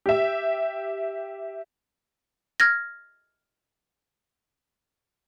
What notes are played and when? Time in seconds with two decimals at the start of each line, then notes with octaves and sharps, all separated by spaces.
0.06 G4 E5
2.60 F6 G#6 A#6